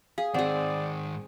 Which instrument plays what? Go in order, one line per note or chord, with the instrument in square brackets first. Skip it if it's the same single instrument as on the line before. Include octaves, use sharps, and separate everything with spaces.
[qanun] G#4 [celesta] F5
[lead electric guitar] G#2 D#3 [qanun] C4 G#4 [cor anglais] D5 [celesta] F#5